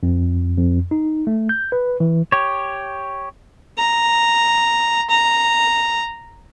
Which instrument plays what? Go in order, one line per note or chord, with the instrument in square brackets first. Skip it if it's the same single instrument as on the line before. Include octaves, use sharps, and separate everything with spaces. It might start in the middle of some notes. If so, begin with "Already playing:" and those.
[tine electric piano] F2
F2
D#4
A3
G6
B4
E3
[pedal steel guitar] G4 C#5
[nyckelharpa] A#5
A#5